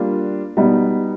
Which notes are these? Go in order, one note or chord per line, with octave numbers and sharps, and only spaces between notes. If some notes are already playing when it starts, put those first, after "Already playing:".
Already playing: G3 A#3 D4 F4
B2 G3 B3 D#4